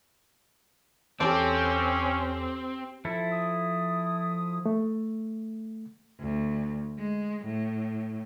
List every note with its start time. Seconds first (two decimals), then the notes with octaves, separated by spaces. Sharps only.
1.20 E2 C4 C#4 G4 A4 C6 D6
3.05 F3 E4 A4
3.31 D#6
4.66 A3
6.20 D2
6.99 G#3
7.45 A2